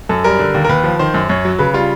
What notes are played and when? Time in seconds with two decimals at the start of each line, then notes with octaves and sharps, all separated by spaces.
0.09 F#2 A4
0.24 G3 A#4
0.39 D3
0.54 D#2
0.64 A#4
0.69 D#2 B4
0.84 F3
0.99 D#3 C5
1.14 F#2
1.29 F#2 C#5
1.45 F#3
1.59 C#3 B4
1.74 G3 F4